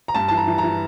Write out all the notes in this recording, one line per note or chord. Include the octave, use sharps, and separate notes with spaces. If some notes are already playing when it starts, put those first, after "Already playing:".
A#5
G2 A5
E3 A5
A#5
E3
A#5
E3